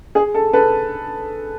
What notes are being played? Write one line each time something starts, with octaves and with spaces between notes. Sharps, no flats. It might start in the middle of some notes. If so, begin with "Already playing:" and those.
G#4
A4
A4 B4